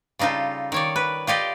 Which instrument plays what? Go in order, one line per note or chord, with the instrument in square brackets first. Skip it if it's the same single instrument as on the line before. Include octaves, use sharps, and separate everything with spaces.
[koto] C#3 G3 D#4 F4 A4
D#3 C#5 D5
B4
F4 G4 D5 D#5